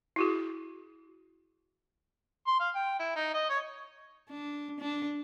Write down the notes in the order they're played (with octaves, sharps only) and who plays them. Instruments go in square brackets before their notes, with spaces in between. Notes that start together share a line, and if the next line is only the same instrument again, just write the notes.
[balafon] E4 F#4 G#4
[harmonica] C6
F5
G5
E4
D#4
D#5
C#5
[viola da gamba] D4
D4